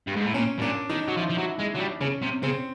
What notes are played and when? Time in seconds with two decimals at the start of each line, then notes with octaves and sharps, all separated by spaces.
0.07 G2
0.16 G#2
0.25 A2
0.34 A#2 C#4
0.58 B2
0.61 A#2 D4
0.89 D#3 D#4
1.08 F#3
1.17 F3 E4
1.30 F3
1.39 F#3
1.46 E4
1.60 G#3
1.74 F#3 D4
1.80 G3
2.01 C#3 C#4
2.22 C3
2.43 C#3 C4